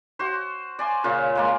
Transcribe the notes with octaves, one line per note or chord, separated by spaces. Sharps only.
F#4 C5
D5 G#5 C6
A#2 C#3 F4
G#3 A#3 D5